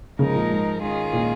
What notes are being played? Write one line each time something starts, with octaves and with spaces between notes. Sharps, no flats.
C#3 F3 G#3 D#4 A#4
A#2
G#2
D#3 G#3 C#4 F4 G#4
A#2